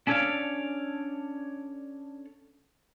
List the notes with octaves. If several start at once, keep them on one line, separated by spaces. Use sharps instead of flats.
C#4 D4 A4 C#5 D5 F5